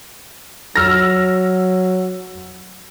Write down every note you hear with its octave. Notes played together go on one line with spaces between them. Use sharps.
F#3 E6 F6 A#6